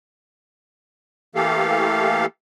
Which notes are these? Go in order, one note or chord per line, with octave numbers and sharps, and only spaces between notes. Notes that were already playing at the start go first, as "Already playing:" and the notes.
E3 A3 A#3 G4 A4 F5